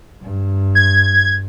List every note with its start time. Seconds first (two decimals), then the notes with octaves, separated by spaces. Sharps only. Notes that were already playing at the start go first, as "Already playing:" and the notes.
0.23 G2
0.75 G#6